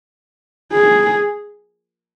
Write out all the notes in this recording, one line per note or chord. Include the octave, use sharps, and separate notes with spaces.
G#4